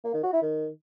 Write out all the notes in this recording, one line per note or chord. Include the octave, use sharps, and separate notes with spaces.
A#3
D#3
F#4
E4
D#3